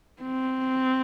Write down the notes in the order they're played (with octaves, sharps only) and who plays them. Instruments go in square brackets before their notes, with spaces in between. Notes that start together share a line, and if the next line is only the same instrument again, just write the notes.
[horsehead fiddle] C4